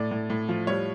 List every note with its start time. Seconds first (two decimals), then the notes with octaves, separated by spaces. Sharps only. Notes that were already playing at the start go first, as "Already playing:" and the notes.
Already playing: A2 D5
0.11 A2
0.30 A2
0.49 F3
0.67 G3 C#5